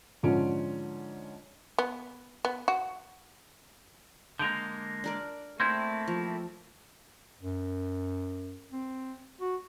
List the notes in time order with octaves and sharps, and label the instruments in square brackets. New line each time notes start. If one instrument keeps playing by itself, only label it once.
[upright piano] G#2 D3 F3 C#4 F4 D7
[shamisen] B3
B3
F#4
[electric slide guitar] D3 G#3 A#3 [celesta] G6 D7 F7
[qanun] D4 A#4 D5
[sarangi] A3 [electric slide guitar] A#3 C4 E4 [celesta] C6 G6 G#6
[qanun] F3
[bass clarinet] F#2
C4
F#4